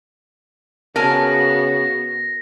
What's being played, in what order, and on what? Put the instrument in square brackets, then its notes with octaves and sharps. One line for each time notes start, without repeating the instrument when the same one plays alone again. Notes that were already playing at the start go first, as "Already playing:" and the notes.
[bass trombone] C#3 [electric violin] B3 F#4 [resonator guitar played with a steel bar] A#4 G#5 A5 [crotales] A#6